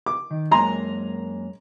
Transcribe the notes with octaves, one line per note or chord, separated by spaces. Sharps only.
D6
D#3
F#2 G#3 A#3 G#5 A#5 C6